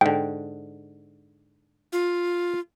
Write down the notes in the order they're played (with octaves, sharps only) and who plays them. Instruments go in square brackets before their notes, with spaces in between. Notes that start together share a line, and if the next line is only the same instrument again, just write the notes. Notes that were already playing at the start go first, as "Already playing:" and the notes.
[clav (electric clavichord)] G#2 D3 [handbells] G5
[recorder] F4